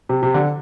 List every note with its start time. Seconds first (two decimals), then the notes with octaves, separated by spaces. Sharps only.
0.09 C3
0.23 C3
0.34 D3